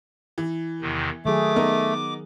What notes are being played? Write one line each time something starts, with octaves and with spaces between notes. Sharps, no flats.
E3
E2 C3 D#3
D#3 F#3 A3 G#4 D6
B3 D#4 A#4